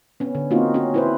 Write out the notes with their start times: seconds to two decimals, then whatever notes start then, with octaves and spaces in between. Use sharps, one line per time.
0.20 B3 C#4
0.35 D3
0.51 A#3 C4 D#4 F4 F#4
0.74 C#4 F#4
0.94 E4 B4 C5